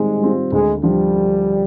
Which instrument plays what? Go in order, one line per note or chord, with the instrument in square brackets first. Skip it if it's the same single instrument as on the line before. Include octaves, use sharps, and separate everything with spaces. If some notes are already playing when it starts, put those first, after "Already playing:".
Already playing: [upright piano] D#3 G3 C4 [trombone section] G#3
[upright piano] G3 C4 F4
[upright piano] D2 [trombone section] G#3
[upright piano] D3 F3 [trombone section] G3